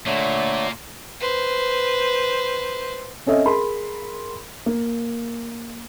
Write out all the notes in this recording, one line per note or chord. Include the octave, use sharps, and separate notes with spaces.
A#2 D3 A3 C#5
B4 C5
C4 C#4 A4 D#5 E5
G#4 A#4 B5 C6
A#3